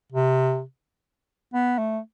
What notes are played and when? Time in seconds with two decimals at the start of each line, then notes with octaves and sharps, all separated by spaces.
0.12 C3
1.54 B3
1.78 A3